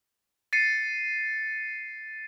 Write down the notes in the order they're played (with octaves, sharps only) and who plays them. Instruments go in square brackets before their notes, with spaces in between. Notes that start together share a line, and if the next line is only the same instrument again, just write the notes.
[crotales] A6 C7 C#7 D#7